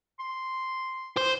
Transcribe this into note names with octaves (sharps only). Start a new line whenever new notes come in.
C6
C5